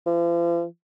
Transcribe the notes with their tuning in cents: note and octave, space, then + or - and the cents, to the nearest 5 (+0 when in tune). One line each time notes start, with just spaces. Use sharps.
F3 -40